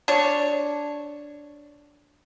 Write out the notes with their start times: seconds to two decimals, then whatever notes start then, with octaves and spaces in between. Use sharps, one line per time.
0.08 D4 C#5